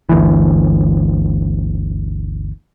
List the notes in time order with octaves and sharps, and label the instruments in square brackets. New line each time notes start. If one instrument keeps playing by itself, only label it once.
[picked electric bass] G1 D2 E3